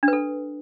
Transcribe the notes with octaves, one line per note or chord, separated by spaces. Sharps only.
D4
B4
A4